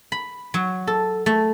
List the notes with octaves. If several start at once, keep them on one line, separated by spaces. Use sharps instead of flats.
B5
F#3
A4
A3